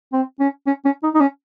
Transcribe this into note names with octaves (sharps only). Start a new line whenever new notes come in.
C4
C#4
C#4
C#4
D#4
D#4
C#4